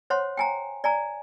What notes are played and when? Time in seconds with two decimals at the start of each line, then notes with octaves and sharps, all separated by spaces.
0.10 C5 C#5 F#5 C6
0.37 G5 G#5 A#5
0.84 D5 G#5 A#5